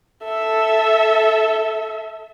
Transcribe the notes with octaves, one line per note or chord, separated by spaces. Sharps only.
A4 E5